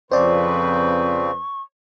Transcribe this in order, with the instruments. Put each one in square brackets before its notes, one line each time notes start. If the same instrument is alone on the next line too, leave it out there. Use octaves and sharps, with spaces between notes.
[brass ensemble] F2 B4 [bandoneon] C#3 F3 C4 [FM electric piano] C5 D5 [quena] C#6